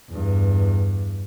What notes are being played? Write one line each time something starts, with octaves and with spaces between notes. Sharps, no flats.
E2 G2